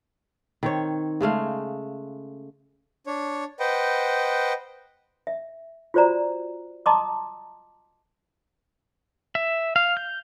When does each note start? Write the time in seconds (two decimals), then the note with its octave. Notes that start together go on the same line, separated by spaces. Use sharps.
0.63 D#3 C4 C#5
1.21 C#3 G#3 A3 F5
3.07 D4 C#5
3.60 B4 C5 D#5 F#5 G5
5.27 E5
5.94 F4 F#4 C5 D5 A#5
6.86 D#5 A5 A#5 C6 D6 D#6
9.35 E5
9.76 F5
9.97 G6